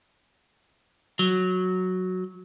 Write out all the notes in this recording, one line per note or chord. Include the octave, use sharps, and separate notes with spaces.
F#3